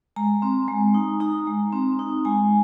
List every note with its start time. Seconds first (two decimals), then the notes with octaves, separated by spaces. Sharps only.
0.16 G#3 A#5
0.42 C4
0.68 G#3
0.94 D#4
1.20 D#4 A#5
1.47 G#3
1.73 C4
1.99 D#4
2.25 G#3 G#5